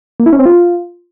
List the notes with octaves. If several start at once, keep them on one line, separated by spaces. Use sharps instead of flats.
A#3
E4
C#4
C4
F4